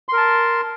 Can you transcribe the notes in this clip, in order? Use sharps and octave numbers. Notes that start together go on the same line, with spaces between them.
A#4 A5 C6